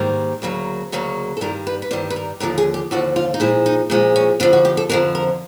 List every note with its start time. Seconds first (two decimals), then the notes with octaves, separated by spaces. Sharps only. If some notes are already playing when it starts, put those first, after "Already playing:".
Already playing: G#2 D#3 G3 A#3
0.42 D2 C#3 F#3 A#3
0.92 D2 C#3 F#3 A#3
1.37 A4
1.41 G2 D#3 G3 A#4
1.67 B4
1.82 B4
1.91 G2 D#3 G3 C5
2.10 B4
2.16 A#4
2.40 D#2 D3 F3 A#4
2.58 G#4
2.74 G4
2.91 D#2 D3 F3 F#4
3.16 F4
3.34 D#4
3.40 A#2 F3 G#3 E4
3.66 D#4
3.90 A#2 F3 G#3
4.16 C#4
4.40 F2 D3 F3 D4
4.53 F#4
4.65 G4
4.77 A4
4.89 F2 D3 F3 A#4
5.15 A#4